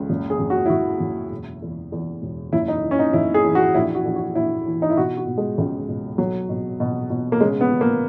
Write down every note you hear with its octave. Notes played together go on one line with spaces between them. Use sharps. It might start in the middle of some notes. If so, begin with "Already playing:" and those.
Already playing: C#2
F#1
G#4
F#1
F#4
E4
F#1 F#4
F#1
E1
E2
E2
E1
F#1 E4
D#4
E3
C#4
D#4
F#1 E4
G#4
E3
F#4
A#1 E4
F#4
A#1
F#4
A#1 E4
E3
D#4
E4
B2 F#4
F#4
B2
G#3
C#2
B2
B1 F#3
B2
B2
B2
A#3
C#3 G#3
B3
C#3
A#3